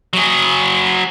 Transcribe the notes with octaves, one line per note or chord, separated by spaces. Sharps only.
F#3 G#4